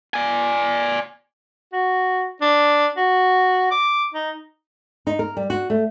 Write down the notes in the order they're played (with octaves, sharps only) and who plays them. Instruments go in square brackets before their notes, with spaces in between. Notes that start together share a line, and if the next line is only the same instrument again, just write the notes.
[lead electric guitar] D5 G#5
[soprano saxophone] F#4
D4
F#4
D6
D#4
[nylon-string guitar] D#4
A#4
G3
F#4
A3